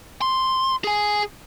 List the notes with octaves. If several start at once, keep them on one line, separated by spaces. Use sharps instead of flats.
C6
G#4 G#5